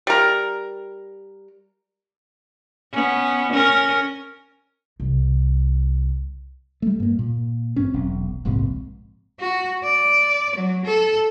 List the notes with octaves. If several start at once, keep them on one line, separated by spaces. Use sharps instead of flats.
G3 A#4
B3 C#4
C#4 A#4
C2
G3 A3
G2 A#3
A#2
A1 G2 C4 C#4
E1 B1
D1 A#1 G#2 C3
F#4
D5
F#3
A4